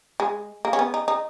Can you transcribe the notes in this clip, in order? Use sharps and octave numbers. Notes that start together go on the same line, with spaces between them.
G#3
A#3
C#4
B3
D#4
D#4